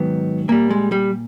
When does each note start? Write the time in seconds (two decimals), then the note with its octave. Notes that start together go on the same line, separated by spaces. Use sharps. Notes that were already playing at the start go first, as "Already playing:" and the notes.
Already playing: G#2 D#3 F#3 B3
0.48 A#2 G3 A#3
0.71 G#3
0.92 G3